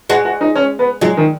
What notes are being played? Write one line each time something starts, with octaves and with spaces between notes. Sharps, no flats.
G#3 F#4
F#4
D#4
C#4
B3
F#3 G#3
D#3